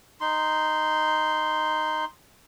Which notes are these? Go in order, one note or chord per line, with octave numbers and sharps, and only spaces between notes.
D#4 C6